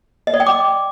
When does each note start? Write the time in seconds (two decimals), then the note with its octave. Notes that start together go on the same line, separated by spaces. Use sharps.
0.27 D#5
0.34 D5
0.40 G5
0.46 D6